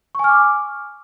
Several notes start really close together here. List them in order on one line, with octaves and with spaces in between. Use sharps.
C#6 G#5 F6 D6